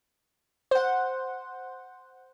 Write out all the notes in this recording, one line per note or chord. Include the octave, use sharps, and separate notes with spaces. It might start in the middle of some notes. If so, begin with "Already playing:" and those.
C5 F#5